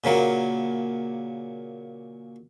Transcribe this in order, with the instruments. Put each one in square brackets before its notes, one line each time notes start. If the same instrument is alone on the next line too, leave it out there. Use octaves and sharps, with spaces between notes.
[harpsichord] A#2 C#3 F#3 A#3